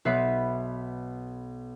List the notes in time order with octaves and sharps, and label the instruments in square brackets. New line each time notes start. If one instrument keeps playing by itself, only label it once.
[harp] B1 B3 B4 E5 B5 C7